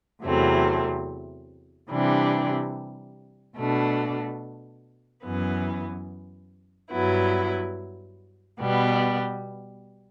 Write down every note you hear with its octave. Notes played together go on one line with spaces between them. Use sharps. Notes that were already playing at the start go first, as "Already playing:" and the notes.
E2 C3 F#3 A3 C4
C3 E3 G3 D4
B2 A3 D4
F#2 E3 B3
G2 F#3 B3 E4
B2 G3 B3